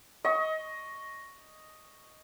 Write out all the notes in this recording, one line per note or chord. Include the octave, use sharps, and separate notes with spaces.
D#5 C#6